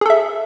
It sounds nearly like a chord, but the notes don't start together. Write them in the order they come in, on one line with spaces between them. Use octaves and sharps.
G#4 A4 E5